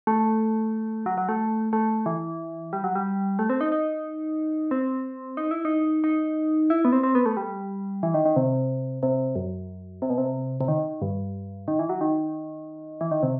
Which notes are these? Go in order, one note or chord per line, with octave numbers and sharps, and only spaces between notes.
A3
F#3
F#3
A3
A3
E3
G3
F#3
G3
A3
C4
D#4
D#4
C4
D#4
E4
D#4
D#4
E4
B3
C4
C4
B3
A3
G3
E3
D#3
D#3
C3
C3
F#2
C3
B2
C3
C3
D#3
G2
D#3
E3
F#3
D#3
E3
D#3
C3